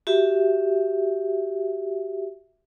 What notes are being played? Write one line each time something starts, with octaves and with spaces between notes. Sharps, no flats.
F#4 G4 E5